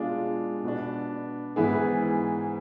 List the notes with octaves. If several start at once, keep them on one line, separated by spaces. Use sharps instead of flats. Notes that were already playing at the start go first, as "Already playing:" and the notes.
Already playing: B2 G#3 D4 F4 G#4
B2 B3 D4
G#2 E3 B3 E4 G#4